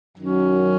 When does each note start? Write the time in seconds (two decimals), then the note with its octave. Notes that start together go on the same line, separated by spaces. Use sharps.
0.17 F#2 D#3 F#3 C#4